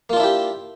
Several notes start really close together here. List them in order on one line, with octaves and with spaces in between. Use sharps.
A#3 F4 D4 E4 G4